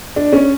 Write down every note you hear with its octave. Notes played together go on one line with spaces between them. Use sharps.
D4
C#4